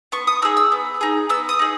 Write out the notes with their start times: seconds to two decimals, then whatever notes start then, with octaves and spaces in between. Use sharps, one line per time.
0.12 B3 C#6
0.27 D#6
0.42 D#4 G#4 E6
0.57 E6
0.72 B3
1.01 D#4 G#4
1.29 B3 E6
1.49 D#6
1.59 D#4 G#4